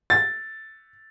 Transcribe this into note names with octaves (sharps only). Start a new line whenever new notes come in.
A6